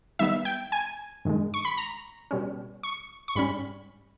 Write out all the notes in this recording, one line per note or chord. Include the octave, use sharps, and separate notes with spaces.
D#3 G3 B3 D#4 E5
G5
G#5
G2 D#3 G#3
C#6
B5
A#5
B2 G3 C#4
C#6
C#6
G#2 G3 C#4 B5